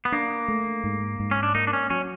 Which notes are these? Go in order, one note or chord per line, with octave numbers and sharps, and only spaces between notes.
B3
A#3 D4
A3
G#2
G#2
C#4
D4
A#3 D#4
D4
C#4
F#3 C#4